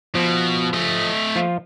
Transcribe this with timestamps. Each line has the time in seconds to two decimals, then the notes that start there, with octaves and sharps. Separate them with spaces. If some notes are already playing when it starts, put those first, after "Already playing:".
0.15 B2 F3
0.74 A3 D#5
1.36 F3 F4